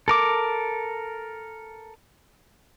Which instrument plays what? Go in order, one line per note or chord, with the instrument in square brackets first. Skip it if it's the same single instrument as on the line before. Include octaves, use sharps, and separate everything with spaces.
[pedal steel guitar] A4 A#4 D6